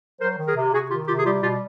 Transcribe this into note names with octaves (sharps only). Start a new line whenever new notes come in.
F#3 A#4 C5
D#3
G#4 A#4
C3
C3 F#4 G#4
D#3 F4 G4
C3 F4 G4
G#4
G3 F4 G4
B2 F4 G4